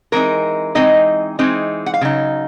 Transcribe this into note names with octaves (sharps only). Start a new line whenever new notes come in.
E3 G#3 C4 D#4 A#4
E3 G#3 C4 D#4 D#5
E3 G#3 C4 D#4
F#5
F5
C#3 F#3 D#4